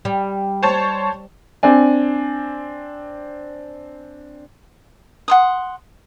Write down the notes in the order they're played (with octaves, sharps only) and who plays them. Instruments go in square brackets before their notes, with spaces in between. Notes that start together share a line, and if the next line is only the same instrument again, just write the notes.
[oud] G3
[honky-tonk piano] C5 C#5 A5
[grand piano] C4 D4 G#5
[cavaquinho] F#5 C6 D#6